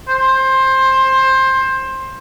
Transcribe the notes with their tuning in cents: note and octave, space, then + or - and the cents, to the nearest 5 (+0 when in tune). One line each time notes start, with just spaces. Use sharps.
C5 +15